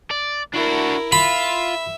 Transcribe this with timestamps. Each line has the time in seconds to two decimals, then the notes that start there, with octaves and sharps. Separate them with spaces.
0.11 D5
0.54 D4 E4 F#4 A#4
1.12 F4 E5 B5